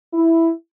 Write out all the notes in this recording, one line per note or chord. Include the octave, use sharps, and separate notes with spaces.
E4